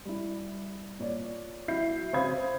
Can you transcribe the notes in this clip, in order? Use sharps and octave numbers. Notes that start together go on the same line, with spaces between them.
G3 E4
A#2 C#5 D5
F#3 E4 E5 G6 C7
C#3 C4 F5 B5 D#6 G#6